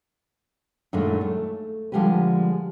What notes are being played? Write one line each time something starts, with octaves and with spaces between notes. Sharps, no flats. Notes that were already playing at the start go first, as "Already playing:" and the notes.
F#2 A#2 D#3 G#3 A3 D4
A3
D3 F3 G3 G#3 G4 B4